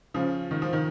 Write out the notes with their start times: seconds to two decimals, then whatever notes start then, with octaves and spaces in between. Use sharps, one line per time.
0.14 C#3 F3
0.51 D#3
0.62 F3
0.73 D#3